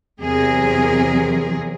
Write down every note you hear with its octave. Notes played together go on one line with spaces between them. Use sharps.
E2 C3 F#3 G#4 A#4